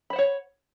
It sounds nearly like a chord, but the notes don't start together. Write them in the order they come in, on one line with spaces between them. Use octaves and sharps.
B5 C5 F#5 C#5